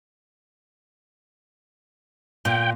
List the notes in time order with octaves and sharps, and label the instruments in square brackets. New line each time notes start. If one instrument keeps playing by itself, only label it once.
[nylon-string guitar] A#2 [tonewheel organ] G5